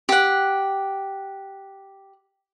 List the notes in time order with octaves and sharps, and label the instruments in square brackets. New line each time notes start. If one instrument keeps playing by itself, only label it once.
[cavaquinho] G4 F#5